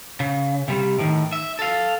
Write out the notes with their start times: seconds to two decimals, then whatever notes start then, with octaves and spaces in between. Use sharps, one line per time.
0.20 C#3
0.68 C3 G3
0.99 A2 D#3
1.33 E5
1.59 A4 F5